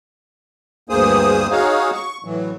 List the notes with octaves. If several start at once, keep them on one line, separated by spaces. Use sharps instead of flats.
D2 G2 A#3 G#4 C5 D#6
D#4 F#4 G#4 C#5 F5
C#6
A2 E3 F#3